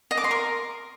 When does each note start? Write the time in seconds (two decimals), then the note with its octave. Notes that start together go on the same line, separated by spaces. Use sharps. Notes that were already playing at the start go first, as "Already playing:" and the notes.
0.11 D#5
0.17 D6
0.24 C6
0.31 A#4